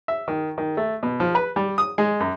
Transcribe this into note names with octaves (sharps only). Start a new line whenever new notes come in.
E5
D#3
D#3
A3
B2
F3
B4
G3
D#6
G#3
F#2